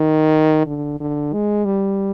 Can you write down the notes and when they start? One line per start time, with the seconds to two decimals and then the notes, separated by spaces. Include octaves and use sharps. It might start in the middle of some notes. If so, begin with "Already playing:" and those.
Already playing: D#3
0.67 D3
1.00 D3
1.33 G#3
1.65 G3